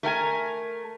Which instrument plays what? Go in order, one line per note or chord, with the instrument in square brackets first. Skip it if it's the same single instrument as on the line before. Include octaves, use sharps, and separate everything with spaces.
[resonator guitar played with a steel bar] A3 A#4 G5 G#5